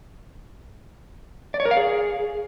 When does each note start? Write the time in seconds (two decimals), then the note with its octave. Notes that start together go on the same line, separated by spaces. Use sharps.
1.54 D5
1.60 C#5
1.65 A#4
1.71 F5
1.77 G#4